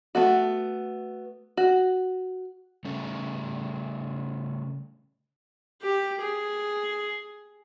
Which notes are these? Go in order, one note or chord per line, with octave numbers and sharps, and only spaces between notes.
A3 B3 F#4
F#4
C#3 G3 A3 C#4
G4
G#4